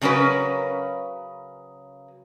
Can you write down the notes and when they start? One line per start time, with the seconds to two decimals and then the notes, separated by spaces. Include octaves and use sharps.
0.01 C#3 F#3 C#4 A#4 B4